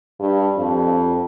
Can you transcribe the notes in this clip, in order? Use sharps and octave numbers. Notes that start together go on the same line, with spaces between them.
G2
F2